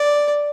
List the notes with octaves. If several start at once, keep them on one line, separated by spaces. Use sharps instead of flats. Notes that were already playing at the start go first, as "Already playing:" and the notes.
Already playing: D5